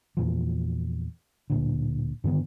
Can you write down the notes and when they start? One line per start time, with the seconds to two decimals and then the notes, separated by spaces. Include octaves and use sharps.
0.17 E2 A#2 F3
1.50 D1 A#2 D3
2.24 G2 D3 D#3 B3